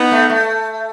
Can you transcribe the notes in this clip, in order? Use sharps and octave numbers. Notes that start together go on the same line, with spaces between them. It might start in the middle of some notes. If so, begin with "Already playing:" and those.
Already playing: B3 D#4
A3
A3